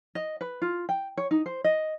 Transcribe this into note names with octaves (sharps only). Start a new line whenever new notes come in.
D#5
B4
F4
G5
C#5
D#4
C5
D#5